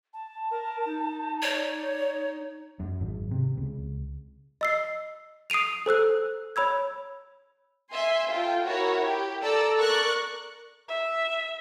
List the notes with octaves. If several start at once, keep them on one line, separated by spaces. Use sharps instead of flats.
A5
A#4
D#4
C#5 D5
F#2
G#1
C3
C#2
D#5 E6 C7
D#6 C7 D7 D#7 F7
A4 C5 E6 F#6
C#5 B5 E6 G#6
E5 G#5 C6
F4 A4 G5
E4 F#4 A#4 C#5
G4
A4 D5 A#5 E6
A#4 D5 C#6 F#6
E5